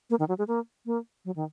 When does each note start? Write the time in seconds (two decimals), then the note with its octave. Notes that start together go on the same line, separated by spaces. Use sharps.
0.10 A#3
0.19 D#3
0.29 F#3
0.38 G#3
0.48 A#3
0.86 A#3
1.25 F#3
1.36 D#3